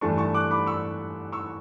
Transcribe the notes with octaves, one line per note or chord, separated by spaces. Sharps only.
G2 E3 A3 D4 A5 C#6
A5 C#6
D6 F#6
B5 D6
C#6 E6
C#6 E6